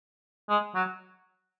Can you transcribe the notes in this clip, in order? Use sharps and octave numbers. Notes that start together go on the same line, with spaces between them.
G#3
F#3